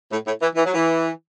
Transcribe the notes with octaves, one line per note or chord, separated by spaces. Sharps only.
A2
A2
E3
E3
F#3
E3